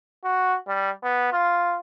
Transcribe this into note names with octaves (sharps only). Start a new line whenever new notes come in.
F#4
G3
B3
F4